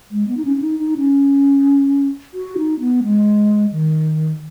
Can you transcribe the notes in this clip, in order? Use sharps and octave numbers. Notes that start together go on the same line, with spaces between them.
G#3
B3
D#4
C#4
C#4
D#4
D#4
C#4
F#4
D#4
B3
G#3
D#3